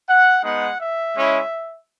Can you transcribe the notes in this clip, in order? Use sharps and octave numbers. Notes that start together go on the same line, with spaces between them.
F#5
G#3 B3 D#4 F#5
E5
G#3 C#4 E4